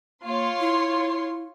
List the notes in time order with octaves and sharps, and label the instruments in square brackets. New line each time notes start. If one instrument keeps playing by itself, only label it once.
[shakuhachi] A#3 [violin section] F4 C#5 C6
[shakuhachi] E4